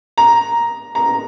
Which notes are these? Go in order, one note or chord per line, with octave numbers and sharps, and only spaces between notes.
A#5
A#5